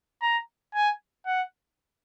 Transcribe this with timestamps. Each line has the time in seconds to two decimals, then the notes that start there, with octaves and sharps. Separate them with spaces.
0.22 A#5
0.74 G#5
1.26 F#5